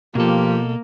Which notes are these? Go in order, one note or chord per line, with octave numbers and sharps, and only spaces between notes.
B2 F3 A#3 F4 G4 A4